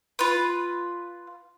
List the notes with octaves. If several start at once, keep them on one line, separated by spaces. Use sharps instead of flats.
F4 B4